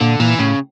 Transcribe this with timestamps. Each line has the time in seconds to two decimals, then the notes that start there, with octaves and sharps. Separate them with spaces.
0.01 A#2 D3
0.20 A#2 E3
0.39 A2 C#3